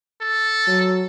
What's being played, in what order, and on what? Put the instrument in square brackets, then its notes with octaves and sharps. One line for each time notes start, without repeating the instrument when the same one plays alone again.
[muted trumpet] A4
[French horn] F#3